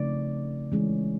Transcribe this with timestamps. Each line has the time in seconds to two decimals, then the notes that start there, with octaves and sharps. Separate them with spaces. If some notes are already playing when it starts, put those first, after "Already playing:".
Already playing: C#3 F3 A3 C4 D#4 D5
0.72 E3 G#3 C#4